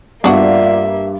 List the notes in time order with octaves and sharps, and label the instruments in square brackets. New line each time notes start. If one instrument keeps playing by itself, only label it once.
[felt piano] G2 [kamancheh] A#3 E5 [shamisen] B3 D4 F#4 [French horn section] F4 D5